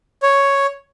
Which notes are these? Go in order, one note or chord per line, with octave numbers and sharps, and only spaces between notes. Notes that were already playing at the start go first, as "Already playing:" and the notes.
C#5